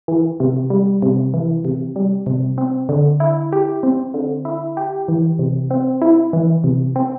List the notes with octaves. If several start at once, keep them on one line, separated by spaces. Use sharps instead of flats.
E3
C3
G3
C3
E3
C3
G3
C3
C4
D3
E4
G4
C4
D3
E4
G4
E3
C3
C4
E4
E3
C3
C4